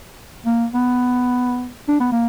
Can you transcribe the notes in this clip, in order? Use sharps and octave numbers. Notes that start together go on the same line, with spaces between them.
A#3
B3
D4
B3
A#3